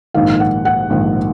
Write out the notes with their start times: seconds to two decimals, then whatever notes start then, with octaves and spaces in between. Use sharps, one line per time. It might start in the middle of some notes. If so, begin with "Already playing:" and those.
0.14 A#1 G#2 D#3 F5
0.40 F#5
0.65 F#5
0.90 A#1 G#2 D#3